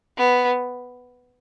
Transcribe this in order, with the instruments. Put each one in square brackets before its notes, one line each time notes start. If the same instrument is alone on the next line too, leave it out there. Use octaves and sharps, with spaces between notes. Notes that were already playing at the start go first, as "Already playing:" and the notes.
[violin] B3